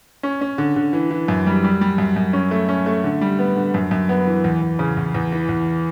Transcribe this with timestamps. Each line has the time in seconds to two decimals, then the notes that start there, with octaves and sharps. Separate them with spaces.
0.23 C#4
0.41 C#4
0.58 D3
0.76 D3
0.93 E3
1.11 E3
1.28 F#2
1.46 G3
1.64 G3
1.81 G3
1.98 F#2
2.16 F#2
2.33 C#4
2.51 A3
2.69 C#4
2.86 A3
3.04 D3
3.21 G3
3.39 B3
3.57 D3
3.74 F#2
3.91 F#2
4.09 B3
4.27 E3
4.44 E2
4.61 E2
4.79 C#3
4.97 E2
5.14 E2
5.32 E3
5.49 E2